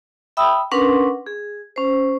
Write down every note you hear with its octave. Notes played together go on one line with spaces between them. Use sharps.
E5 G5 B5 D#6 E6
C#4 D4 A#4 B4 F#5 C6
G#4
C#4 C5